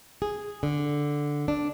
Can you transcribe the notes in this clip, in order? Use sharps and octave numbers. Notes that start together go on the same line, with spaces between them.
G#4
D3
D4